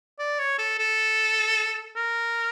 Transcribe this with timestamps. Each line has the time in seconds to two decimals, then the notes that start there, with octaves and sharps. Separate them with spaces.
0.19 D5
0.39 C#5
0.59 A4
0.79 A4
1.96 A#4